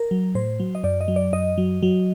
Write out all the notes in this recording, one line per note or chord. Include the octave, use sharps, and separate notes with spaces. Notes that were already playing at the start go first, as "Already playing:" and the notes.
Already playing: A#4
F#3
A2 C5
F#3
D#5
F#2 D5
D#5
F#3
D5
F#2 D#5
F#3
F#3